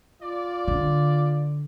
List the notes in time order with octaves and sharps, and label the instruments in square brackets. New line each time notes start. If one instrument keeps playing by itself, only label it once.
[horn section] F4 D5
[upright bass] D3